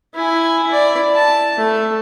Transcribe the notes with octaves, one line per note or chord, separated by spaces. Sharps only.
E4 G#5
E4 D5
A5
A3